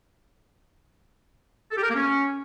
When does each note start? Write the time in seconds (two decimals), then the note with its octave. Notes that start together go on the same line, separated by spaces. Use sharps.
1.72 A4
1.78 G4
1.83 A#4
1.89 A#3
1.95 C#4